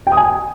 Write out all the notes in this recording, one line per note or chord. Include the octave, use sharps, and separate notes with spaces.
G5
D#6
G#5